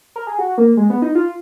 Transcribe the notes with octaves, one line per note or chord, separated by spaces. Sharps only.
A#4
G#4
F#4
A#3
G#3
B3
D#4
F4